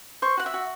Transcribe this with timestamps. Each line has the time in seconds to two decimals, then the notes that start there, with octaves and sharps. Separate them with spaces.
0.22 C5 C#6
0.37 F#4 F#5
0.46 E5
0.54 F#4